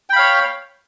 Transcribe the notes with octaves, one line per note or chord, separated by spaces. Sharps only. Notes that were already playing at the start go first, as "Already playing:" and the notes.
C#5 F5 G5 B5